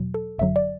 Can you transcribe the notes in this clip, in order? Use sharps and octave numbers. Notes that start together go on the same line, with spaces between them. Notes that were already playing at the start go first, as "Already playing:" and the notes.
Already playing: E2 B2 F#3
A4
G1 F#2 D3 F#3 E5
D5